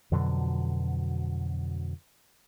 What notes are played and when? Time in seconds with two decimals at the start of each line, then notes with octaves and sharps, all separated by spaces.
0.12 F2 B2 D3 F#3